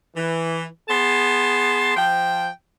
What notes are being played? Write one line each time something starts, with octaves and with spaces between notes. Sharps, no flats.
E3
B3 G#4 A5 C6
F3 G5